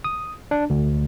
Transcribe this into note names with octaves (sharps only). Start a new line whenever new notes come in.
D#6
D4
D2